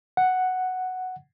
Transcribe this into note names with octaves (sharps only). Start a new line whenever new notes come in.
F#5